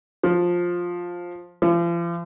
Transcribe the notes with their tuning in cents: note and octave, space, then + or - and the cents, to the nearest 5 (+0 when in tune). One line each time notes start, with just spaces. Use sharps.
F3 +10
F3 -40